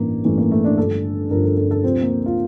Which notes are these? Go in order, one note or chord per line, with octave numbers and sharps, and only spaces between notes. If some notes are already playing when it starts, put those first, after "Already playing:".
Already playing: A1 G2 E3 A#3
A1 G2 E3 A3
A#3
A3
D4
G1 G2 F3 A4
G1 G2 F3 A#4
A4
A4
A4
D2 C3 F3 C4
A#3
F4